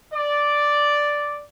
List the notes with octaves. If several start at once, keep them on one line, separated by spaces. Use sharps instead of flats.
D5